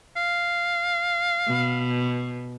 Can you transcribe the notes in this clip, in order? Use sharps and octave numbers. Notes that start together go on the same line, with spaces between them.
F5
B2